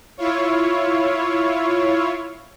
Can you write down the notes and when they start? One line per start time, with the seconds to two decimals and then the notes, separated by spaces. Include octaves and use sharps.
0.18 E4 F4 C#5